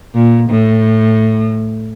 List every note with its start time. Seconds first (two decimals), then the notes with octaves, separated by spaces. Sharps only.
0.14 A#2
0.50 A2